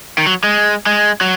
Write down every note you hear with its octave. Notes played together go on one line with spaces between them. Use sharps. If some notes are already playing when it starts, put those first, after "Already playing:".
D#3
F#3
G#3
G#3
F#3